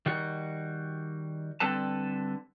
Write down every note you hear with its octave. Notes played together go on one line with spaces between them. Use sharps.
D#3 G3 F#4
D3 G3 C4 A4 B4 A5